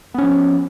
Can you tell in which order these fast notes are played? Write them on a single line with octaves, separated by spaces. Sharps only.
B3 C#4 F3